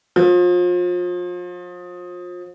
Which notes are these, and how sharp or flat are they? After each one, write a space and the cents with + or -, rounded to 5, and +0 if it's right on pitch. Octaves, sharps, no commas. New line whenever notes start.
F3 +35